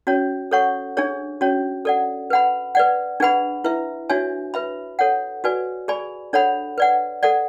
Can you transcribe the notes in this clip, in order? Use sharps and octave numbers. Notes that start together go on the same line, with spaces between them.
C#4 F#4 C#5
A4 C#5 F#5 C#6
D4 G#4 C#5
C#4 F#4 C#5
A4 D5 F#5
B4 F#5 B5
B4 D5 F#5
D4 G#4 B4 F#5 B5
E4 B4 E5
D4 F#4 C#5 E5 G#5
B4 E5 B5
A4 C#5 F#5
F#4 B4 D5 G#5
G#4 D5 G#5 B5
D4 A4 C#5 F#5 B5
B4 D5 F#5
A4 D5 F#5